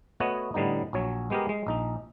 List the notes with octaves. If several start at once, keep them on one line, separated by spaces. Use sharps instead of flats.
A3 B3 F#4 C#5 D#5 F#5
A2 D3 G3 B3 D#4
A#1 F#3 C#5
G#3 B3 G4 G#4 A#4
G#3
A#1 D#4